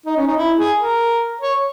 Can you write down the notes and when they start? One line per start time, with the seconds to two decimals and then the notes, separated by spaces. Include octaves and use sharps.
0.06 D#4
0.17 C#4
0.27 D#4
0.37 E4
0.58 G#4
0.79 A#4
1.41 C#5